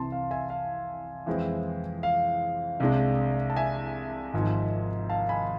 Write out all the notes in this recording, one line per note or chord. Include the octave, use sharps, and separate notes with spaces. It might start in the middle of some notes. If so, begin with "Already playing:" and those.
Already playing: C2 C3 E3 A5 C6
F5
E5 G#5
F5
F2 E3 G#3 C4 E4
F5
C2 C3 G#3 D4
A5
E5 G#5
G#1 G#2 F3
F5 A5
G#5 B5